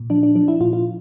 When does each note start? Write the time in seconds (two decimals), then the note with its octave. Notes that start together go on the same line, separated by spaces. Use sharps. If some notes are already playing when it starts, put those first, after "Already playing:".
Already playing: A#2
0.10 F3 D4
0.23 D4
0.35 F3 D4
0.48 E4
0.60 A#2 F4
0.73 F4